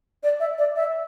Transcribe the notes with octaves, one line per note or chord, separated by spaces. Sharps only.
D5
E5
D5
E5